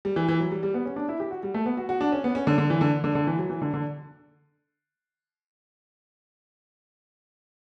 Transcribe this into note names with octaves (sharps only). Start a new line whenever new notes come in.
G3
E3
E3
F#3
G3
G3
B3
C#4
D4
E4
G4
F#4
G3
A3
B3
F#4
F#4
D4
C#4
B3
C#4
D3
D3
E3
D3
D3
D3
E3
F#3
E3
D3
D3